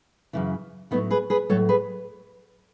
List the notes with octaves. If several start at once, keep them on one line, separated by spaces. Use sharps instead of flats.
F#2 C#3 E3
A2 F#3 B3 D#4
G#4 B4
G#4 B4
A2 F#3 A4 C#5
G#4 B4